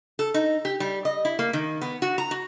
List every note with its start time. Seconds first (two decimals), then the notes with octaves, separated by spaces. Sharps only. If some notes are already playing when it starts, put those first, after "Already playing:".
0.19 A4
0.34 D#4
0.65 G4
0.80 G3
1.05 D#5
1.25 E4
1.39 A#3
1.53 D#3
1.81 B3
2.02 F#4
2.18 A#5
2.31 F#4